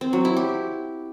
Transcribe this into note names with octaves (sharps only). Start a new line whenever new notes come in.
C4
F#3
E4
G4